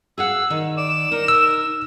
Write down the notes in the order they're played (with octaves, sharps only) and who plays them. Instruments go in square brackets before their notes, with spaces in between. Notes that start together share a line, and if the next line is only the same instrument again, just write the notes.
[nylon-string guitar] G#4 F5 F#5 [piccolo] E6
[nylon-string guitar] D#3
[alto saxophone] D5 [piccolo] E7
[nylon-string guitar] D#4 [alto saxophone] A#4
[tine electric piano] E6